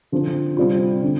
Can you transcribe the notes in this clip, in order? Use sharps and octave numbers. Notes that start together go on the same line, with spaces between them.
D3 F3 C4
C3 G3 C4 F4
D3